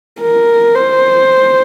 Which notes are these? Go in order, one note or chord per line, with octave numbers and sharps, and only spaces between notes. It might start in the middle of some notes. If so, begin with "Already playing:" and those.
A#4
C5